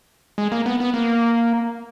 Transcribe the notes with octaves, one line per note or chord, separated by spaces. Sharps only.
G#3
A#3
B3
B3
A#3